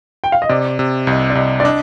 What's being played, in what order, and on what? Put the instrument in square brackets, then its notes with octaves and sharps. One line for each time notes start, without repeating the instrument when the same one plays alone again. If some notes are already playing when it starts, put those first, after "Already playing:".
[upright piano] G5
F5
D#5
[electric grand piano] C3 [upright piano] D5
[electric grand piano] C3
[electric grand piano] C2 [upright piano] D#5
[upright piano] D5
[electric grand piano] C2 [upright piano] D#5
[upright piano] D5
[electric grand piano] D4 [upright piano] D#5